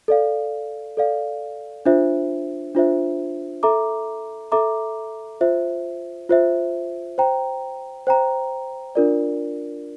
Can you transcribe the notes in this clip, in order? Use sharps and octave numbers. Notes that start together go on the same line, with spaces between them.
A4 D5 F5
A4 D5 F5
D4 F4 C5 E5
D4 F4 C5 E5
A4 E5 A#5 D6
A4 E5 A#5 D6
F4 C5 E5
F4 C5 E5
C5 G5 A#5
C5 G5 A#5
D4 F4 A#4 D5